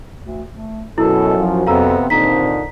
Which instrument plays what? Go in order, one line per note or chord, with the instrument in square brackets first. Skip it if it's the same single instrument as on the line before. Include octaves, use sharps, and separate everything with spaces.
[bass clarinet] D2
A3
[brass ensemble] F#2 [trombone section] B2 [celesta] E4 [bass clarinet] A4
[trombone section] F3 F#3
[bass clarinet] F2 [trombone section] C3 B3 C4 [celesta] F5 A#5 E6
[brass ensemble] D#2 C4 C5 [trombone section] A#2 D3 [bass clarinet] D#4 [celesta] A#5 B6